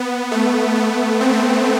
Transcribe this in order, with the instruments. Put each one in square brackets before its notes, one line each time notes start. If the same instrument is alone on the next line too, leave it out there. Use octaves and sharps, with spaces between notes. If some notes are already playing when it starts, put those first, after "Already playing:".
Already playing: [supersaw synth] B3
A3
B3
C4